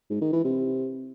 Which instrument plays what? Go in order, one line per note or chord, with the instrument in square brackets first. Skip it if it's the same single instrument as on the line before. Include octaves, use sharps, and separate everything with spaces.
[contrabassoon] G#2
D#3
E3
C3